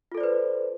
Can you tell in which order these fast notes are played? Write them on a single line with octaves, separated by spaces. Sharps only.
F4 A4 D5 C5 B4